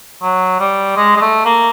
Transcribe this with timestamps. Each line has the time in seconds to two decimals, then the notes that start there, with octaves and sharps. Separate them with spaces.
0.22 F#3
0.60 G3
0.96 G#3
1.16 G#3
1.21 A3
1.45 A#3